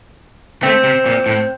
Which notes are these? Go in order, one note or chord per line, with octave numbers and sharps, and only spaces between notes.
A3 C4
C3
A#2
A2